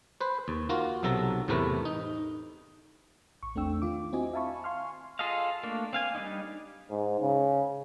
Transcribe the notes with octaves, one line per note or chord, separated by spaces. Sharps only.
B4 C5
D#2
A#3 F4 F#4 A#4
B1 C3 F#3 A4 A#5
E2 A2 C3 A3 A#4 B4
D#4
A1 C#6
E2 A3 C4 D4 G5 E6
D#3 F4 D6
C4 E4 F#4 D#5 G#5
E5 F5 G#5 A5 B5 C#6
F5 G#5 C6 C#6 F6
F4 G#4 A4 D#5 F5
A3 A#3 D4
C4 F5 G#5
G3 C4 D4 D#4
G#2
C#3